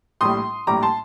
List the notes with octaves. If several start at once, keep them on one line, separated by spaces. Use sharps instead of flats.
A#1 A2 G3 C6 D#6
A#1 A2 G3 A#5 D6
A5 C6